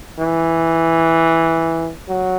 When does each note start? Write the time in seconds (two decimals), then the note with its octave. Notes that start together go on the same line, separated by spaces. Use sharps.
0.19 E3
2.09 F#3